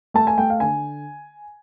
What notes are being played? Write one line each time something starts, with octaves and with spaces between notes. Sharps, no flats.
A3 A5
G#5
A3 G5
F5
D3 G#5